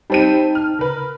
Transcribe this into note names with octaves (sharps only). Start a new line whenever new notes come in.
G3 C4 D#4 G5 A5 D#7
F6
C#3 A#4 B4